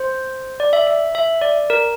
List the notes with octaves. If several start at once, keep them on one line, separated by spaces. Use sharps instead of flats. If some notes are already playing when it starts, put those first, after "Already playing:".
Already playing: C5
D5
E5
E5
E5
D5
A#4